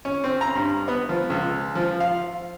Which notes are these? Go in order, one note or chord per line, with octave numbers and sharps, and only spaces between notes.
C#4
C4
A#5
G2
B3
F3
C#2
F3
F5